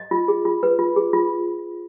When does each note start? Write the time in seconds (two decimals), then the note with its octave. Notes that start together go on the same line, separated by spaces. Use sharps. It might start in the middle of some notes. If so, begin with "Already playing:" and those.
Already playing: D#5
0.11 F4
0.28 G#4
0.45 F4
0.63 B4
0.79 F4
0.96 G#4
1.13 F4